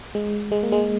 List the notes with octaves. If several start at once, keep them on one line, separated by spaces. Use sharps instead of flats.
G#3
G#3
A#3
G#3